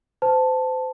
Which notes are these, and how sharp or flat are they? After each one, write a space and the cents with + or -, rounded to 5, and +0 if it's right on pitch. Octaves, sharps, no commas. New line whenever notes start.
C5 -35 A5 +0